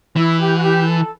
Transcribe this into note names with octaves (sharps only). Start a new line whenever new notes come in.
E3 E4
G4
F#4
G4
A4